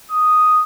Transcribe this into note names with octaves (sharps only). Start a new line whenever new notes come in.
D#6